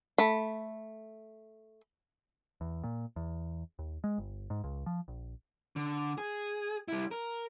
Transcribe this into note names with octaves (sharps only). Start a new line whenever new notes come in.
A3 B5
E2
A#2
E2
D#2
G#3
G1
G#2
C#2
F3
A#1
D3
G#4
G3 E4
A#4